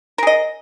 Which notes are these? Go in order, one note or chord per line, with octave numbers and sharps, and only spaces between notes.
G#4 A#4 D#5